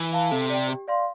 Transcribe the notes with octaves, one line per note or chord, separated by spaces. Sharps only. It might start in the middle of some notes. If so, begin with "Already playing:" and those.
Already playing: E3
F5 A5
C3 A4
D5 G5
G4
D5 F5 C6